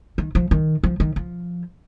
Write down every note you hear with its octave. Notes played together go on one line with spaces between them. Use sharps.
D#3
F3
D#3
F3
D#3
F3